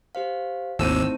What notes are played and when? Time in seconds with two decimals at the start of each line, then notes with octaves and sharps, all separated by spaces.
0.15 G4 C5 F5
0.79 G#1 D#2 A3 C4 D#4 E4 E6 D#7